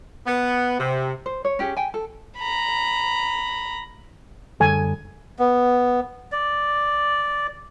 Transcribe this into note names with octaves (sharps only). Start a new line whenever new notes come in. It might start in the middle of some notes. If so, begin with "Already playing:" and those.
B3
C3
C5
C#5
C#4 G4 G#4
G5 G#5
A4
A#5 B5
F#2 D3 G3 A4 G#5
B3
D5